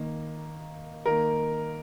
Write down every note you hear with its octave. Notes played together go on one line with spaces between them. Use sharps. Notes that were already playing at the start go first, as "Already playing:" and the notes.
Already playing: D#3 A#3
D#3 A#3 A#4